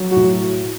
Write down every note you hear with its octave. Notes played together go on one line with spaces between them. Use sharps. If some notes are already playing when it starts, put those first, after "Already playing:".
Already playing: F#3
A2 F#4